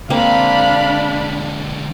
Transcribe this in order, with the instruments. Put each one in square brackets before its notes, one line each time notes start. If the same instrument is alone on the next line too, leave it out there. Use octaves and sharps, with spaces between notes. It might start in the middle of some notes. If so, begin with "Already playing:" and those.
[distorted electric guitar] D3 G#3 [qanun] A#3 C4 [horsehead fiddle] D4 [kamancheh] F5 B5